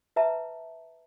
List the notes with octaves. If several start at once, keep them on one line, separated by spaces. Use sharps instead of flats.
B4 E5 A5 A#5